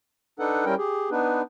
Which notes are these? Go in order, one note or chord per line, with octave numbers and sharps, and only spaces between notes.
D4 D#4 A4 B4 F#5
G3 C#4 E4 A#4 G5
G4 G#4
B3 D4 D#4 B4